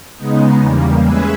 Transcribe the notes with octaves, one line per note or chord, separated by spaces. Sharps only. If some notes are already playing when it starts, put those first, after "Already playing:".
C#3 G#3 B3 D#4
E2 C#3 G3 A#3
G#3 C#4 G#4 B4 E5